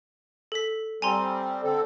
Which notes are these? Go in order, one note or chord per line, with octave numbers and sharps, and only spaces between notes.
A4 B6
G3 C4 G#5 A#5 C6
D3 C4 A4